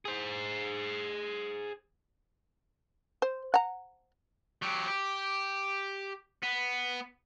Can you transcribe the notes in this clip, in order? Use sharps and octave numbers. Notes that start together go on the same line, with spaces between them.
G#4 C5
C5
F#5 A#5
F#3 G4
G4
B3